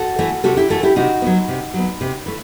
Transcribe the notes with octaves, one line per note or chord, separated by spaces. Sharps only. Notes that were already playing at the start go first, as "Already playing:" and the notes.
Already playing: F#4 A4
E3 A3
C3 F#4 A4
E4 G4
E3 A3 F#4 A4
E4 G4
C3 D#4 F#4
F#3 B3
C3
F#3 B3
C3
E3 A3